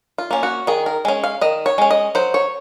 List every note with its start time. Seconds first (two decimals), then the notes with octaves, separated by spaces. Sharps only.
0.18 F4
0.31 A#3 C#4
0.43 F#4
0.67 D#3 G#4
0.86 A#4
1.05 G#3 C#4
1.24 F5
1.41 D#3 D#5
1.66 C#5
1.78 G#3 C#4
1.91 D#5
2.15 F#3 C5
2.34 C#5